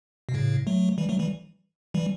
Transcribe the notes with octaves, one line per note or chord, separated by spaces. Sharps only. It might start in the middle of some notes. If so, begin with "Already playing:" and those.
B2
A2 C#3
F#3 A3
E3 G3
F#3 A3
E3 G3
E3 G3